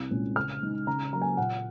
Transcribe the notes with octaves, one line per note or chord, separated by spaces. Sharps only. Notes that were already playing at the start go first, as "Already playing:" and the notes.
Already playing: C2 F#6
A#2 G#3 C#4
C#3 F6
G#3 D#4
C#3 A#5
F#3 A#3 A#5
G#5
A#2 F#5